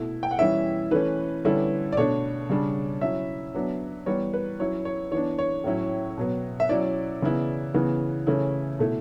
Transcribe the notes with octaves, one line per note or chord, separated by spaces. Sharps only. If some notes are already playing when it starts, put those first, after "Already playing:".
Already playing: B2 A3 E4
G5
F#5
E3 G3 C#4 E4 E5
E3 A3 C#4 B4
D3 G3 C#4 E4
D5
B2 A3 D4 C#5
C#3 G3 D4
F#3 C#4 E4 E5
F#3 B3 D4
E3 G3 B3 C#5
B4
F#3 C#4 E4 C#5
C#5
E3 B3 D4 C#5
C#5
A2 F#3 C#4 E4
B2 F#3 B3
E5
F#3 C#4 E4 D5
C#3 E3 B3 E4
C#3 E3 B3
C#3 E3 A3 C#4 E4
B2 A3 E4